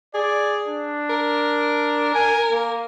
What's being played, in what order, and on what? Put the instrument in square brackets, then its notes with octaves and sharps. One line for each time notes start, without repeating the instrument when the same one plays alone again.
[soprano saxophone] G#4 [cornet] D5
[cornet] D4
[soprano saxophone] A#4
[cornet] G#5
A#3